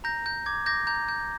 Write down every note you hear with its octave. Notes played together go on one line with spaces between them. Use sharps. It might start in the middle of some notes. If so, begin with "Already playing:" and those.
A#5 G6 A#6
G6
D6 G#6
D6 G6 A#6
A#5 G6
G6